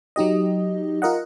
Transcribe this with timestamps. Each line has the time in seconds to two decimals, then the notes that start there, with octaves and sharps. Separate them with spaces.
0.16 F#3 D#4 G4 D#5
1.02 F4 A#4 D#5 F#5